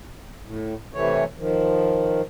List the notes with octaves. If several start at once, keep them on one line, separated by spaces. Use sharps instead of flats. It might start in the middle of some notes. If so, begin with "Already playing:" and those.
A2
C3 E3 A3 C#5
D#3 F3